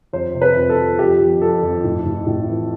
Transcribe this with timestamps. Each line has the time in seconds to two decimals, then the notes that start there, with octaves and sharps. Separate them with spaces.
0.13 F2 C5
0.34 C3
0.42 B4
0.56 F2
0.69 A4
0.77 F3
0.99 F2 G4
1.20 F2
1.41 F2 A4
1.63 F2
1.84 A2
2.06 A2
2.27 A2
2.49 E3